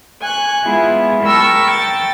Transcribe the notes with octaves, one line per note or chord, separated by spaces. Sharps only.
G#5 C#6 F#6
G#3 B3 E4 F4 G#4
A#4 G5 A5 B5 C#6 E6
G5 A6